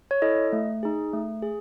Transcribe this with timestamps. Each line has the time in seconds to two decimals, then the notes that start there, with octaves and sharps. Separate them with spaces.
0.11 C#5
0.22 E4 A4 D#5
0.53 A3
0.83 D#4 G#4
1.13 A3
1.42 G#4